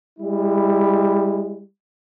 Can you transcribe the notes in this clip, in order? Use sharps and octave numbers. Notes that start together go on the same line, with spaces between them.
G3 G#3 E4